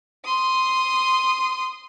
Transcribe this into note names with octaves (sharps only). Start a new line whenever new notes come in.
C6 D#6